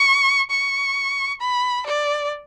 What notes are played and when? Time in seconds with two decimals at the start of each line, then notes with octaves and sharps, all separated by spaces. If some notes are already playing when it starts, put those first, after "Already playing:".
Already playing: C#6
0.50 C#6
1.41 B5
1.87 D5